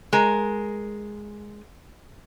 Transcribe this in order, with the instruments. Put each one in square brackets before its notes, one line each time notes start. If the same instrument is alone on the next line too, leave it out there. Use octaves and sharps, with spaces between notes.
[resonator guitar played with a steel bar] G#3 A#4